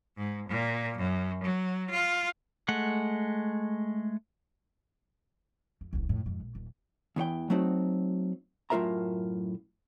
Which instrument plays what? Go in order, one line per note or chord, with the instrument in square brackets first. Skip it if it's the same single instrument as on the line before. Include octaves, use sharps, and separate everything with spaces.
[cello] G#2
A#2
F#2
F#3
F4
[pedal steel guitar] G#3 A3 F#5
[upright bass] F2
D1 C2
F2 A2
F2 G#2
A#1
D#1
[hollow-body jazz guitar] E2 E3 C#5 G5
F#3 A3 C4 D#4 F#4
F#2 A2 F4 A#4 E5 A#5